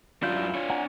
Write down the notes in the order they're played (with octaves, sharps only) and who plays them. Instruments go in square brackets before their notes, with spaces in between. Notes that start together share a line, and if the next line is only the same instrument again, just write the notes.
[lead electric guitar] F#2 D4 [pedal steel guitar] E4 G6 [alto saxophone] F4
[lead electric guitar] D4 C#5
[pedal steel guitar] F#5 G#5 A#5